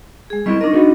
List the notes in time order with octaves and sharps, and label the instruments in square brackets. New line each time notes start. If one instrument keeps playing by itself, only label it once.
[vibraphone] G#3 G#4
[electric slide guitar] G3 C4 E4 [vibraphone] D#5 C#6
[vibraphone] D4 D#5 [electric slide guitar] D#4 A#4
[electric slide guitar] D#4 F#4 G#4